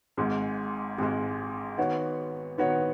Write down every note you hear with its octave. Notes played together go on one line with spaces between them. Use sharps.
G#1 G#2 G#3
G#1 G#2 G#3
D#3 B3 F#4 C#5
D#3 B3 F#4 C#5